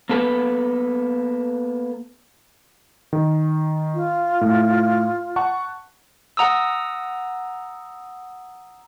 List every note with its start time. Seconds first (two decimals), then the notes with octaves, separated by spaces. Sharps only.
0.09 A#3 B3 A4 B4
3.13 D#3
3.95 F4
4.41 A2
5.36 F#5 A5 C#6
6.37 F#5 A#5 D#6 E6